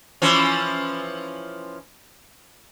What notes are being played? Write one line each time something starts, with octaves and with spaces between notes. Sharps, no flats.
E3 F3 C#4